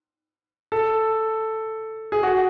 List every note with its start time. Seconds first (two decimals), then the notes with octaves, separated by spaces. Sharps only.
0.72 A4
2.12 G#4
2.23 F#4